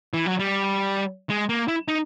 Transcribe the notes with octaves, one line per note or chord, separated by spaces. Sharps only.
E3
F#3
G3
G#3
A#3
E4
D#4